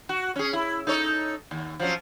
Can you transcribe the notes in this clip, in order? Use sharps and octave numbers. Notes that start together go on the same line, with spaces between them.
F#4
C#4 G#4
E4
D#4 A4 C#5
D#2
F3 F#3 C#4